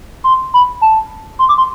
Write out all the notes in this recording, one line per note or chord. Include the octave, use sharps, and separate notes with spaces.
C6
B5
A5
C6
D6
C6